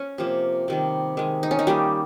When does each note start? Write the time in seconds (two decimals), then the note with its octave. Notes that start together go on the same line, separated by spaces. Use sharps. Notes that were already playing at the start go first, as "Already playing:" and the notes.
Already playing: C#4
0.18 C3 F3 A#3
0.68 C3 D#3 G3
1.17 D#3 G#3
1.43 D#4
1.51 C#4
1.59 D#4
1.67 D#3 G3 A#3 G4